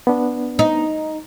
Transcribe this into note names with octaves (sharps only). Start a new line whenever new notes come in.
B3 D4
D#4